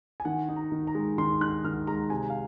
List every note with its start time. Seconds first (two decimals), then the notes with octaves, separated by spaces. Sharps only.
0.20 G#5
0.25 D#3 F#5
0.49 D#4
0.56 A#5
0.72 D#3
0.87 A#5
0.95 G#3
1.18 D#3 C6
1.41 D#4 F#6
1.64 D#3 F6
1.87 G#3 A#5
2.10 C3 G#5
2.30 F5